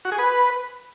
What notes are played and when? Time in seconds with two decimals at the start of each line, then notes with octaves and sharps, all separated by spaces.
0.05 F#4
0.12 G#4
0.18 B4